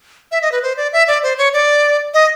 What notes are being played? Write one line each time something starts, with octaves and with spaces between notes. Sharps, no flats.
E5
D#5
B4
C5
D5
E5
D5
C5
C#5
D5
D#5